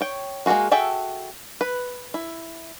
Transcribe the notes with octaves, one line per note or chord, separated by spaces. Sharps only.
C#5 G5
G#3 A#3 F4 F#4 G#4
F#4 G#4 A4 E5 G5
B4
E4